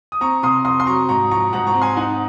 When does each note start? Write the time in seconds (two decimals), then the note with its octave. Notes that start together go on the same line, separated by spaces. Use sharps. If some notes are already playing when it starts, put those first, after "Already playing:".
0.12 D#6
0.21 C4 A#5 C#6
0.43 C3 C6 D#6
0.65 F2 C6 D#6
0.80 C6
0.87 F#3 A#5 C#6
1.09 G#2 A#5 C#6
1.31 F3 A#5 C#6
1.53 G#2 F#5 A#5
1.67 A#5 C#6
1.74 C4
1.82 G#5 C6
1.96 D#4 F#5 A#5